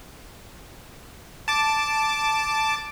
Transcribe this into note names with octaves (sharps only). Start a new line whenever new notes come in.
A5 D6